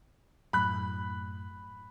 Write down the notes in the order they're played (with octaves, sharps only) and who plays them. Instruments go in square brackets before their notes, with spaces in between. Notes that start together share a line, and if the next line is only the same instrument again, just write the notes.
[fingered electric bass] F#2 A2 [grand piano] B5 F#6